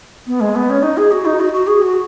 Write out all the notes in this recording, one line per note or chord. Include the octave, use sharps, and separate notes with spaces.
B3
G#3
B3
C#4
D#4
G#4
F#4
D#4
F#4
F#4
G#4
F#4